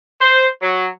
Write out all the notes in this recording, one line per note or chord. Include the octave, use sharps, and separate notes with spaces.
C5
F#3